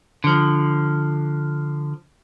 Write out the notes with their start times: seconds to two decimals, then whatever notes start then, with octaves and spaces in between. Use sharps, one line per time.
0.24 D3 F3